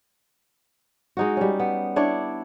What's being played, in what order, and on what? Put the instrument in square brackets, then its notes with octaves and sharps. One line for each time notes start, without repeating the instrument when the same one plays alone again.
[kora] G#3 D#4 F#4
G3 C#4
B3
D4 E4 C#5 D5